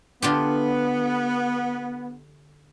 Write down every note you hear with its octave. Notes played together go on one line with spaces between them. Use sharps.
D3 B3 F4 G4